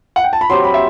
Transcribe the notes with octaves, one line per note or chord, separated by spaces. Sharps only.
F#5
G5
A5
B5
F#3 C4 G4 C6
B5
E5